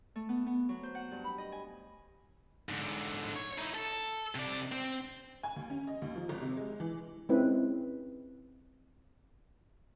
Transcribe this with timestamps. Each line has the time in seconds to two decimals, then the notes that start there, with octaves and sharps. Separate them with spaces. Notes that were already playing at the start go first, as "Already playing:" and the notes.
0.16 A3
0.29 B3
0.46 B3
0.69 F#3
0.83 C5
0.95 F#5
1.11 G2
1.24 B5
1.38 D#5
1.52 G#5
2.69 G#2 D3
3.36 C#5
3.58 D#4 E4
3.75 A4
4.35 C3 D5
4.72 C4
5.43 G#5
5.56 D#2
5.70 C#4
5.87 D#5
6.02 D#2
6.16 F3
6.29 G#1
6.41 C3
6.57 G#3
6.80 E3
7.29 G#3 C4 C#4 E4 B4